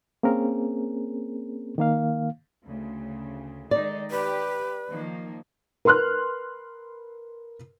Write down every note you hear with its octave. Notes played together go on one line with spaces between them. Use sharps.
A#3 C4 C#4 G#4 A#4
D#3 A#3 F5
D2 C#3
D#3 G#3 D#4 D5
G4 B4
D#3 F3 A#3
A#4 B4 C6 F6 F#6